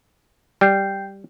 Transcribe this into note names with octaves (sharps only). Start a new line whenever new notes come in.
G3 G5 G6 C7